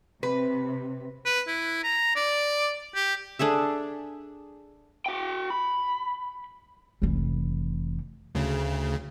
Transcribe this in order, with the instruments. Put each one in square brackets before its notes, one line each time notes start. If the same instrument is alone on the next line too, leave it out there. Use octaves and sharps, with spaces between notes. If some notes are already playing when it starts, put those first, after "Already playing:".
[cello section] C3 [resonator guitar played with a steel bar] B4
[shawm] B4
E4
A#5
D5
G4
[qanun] D4 G#4 A4 E5
[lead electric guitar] F#4 G5
B5
[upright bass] F1 E3
[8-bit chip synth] D2 C#3